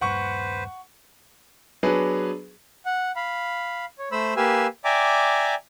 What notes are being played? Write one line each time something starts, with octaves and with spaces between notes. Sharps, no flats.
D#1 G2 B4 C5 F#5 C#6
F#3 B3 D4 G#4 B4
F#5
F5 B5
C#5
A3 C5 B5 E6
A#3 G4 B4 F5 G#5 E6
D5 E5 G5 G#5 A#5 D6